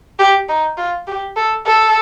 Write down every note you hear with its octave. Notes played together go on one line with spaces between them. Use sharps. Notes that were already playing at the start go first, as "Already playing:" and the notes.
G4
D#4
F4
G4
A4
A4